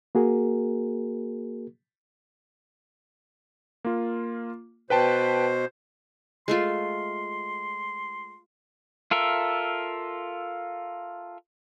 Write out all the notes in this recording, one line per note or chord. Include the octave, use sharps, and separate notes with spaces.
A#3 F#4 G#4 A#4
A#3 F4
B2 B4 C5 G5 A5
G#3 A3 F4 C6
F4 A4 A#4 E5